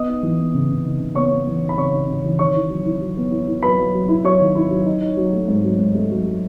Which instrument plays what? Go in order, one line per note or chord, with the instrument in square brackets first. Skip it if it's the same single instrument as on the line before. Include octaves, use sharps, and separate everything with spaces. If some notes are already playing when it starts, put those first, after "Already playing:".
Already playing: [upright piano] B3 D#5 D#6
D#4
E3
B3
C#3
C#3
D#4
C#3
B3 C#5 C#6
B3
E3
D#4
B5
C#3 C#5 C#6
D#4
C#3
E3
D#3 C#5 C#6
E4
F#3
E4
F#3
B3
E4
E4
F#3 B4 B5
F#3
F#3
E4
F#3 C#5 C#6
D#3
E4
F#3
D#4
D#4
F#3
A3
G#2
F#3
G#2
A3
F#3
F#3